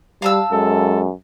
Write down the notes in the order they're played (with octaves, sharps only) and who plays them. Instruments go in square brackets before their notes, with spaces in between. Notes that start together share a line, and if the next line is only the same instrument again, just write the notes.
[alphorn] G3 [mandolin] F5 A5 E6
[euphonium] F#2 [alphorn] G#3 [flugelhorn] A4